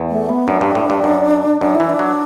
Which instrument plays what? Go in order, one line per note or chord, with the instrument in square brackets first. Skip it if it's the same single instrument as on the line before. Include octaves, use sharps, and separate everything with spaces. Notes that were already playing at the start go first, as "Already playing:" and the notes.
Already playing: [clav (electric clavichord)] E2
[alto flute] A3
B3
[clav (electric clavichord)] F#2 [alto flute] D4
[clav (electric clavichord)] G2
A2
G2
F#2
[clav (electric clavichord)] F#2 [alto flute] D4
[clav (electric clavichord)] E3 [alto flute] E4
[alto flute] D4
[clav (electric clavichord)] F#3